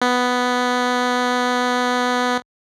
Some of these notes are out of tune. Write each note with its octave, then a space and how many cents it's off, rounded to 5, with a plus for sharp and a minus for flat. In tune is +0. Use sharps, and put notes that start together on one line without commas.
B3 +5